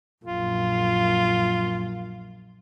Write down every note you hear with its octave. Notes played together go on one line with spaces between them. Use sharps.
A#1 F#2 F4